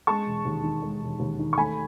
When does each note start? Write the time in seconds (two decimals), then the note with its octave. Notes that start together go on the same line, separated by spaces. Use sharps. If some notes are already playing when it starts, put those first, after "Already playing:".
0.07 G#3 A5 C#6
0.26 E1
0.45 D#2
0.63 D#3
0.82 G#3
1.02 E1
1.20 D#2
1.39 D#3
1.53 C#6
1.58 A3 G#5 B5